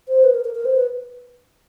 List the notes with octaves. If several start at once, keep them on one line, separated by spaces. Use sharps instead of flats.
C5
B4
A#4
A#4
A#4
C5
B4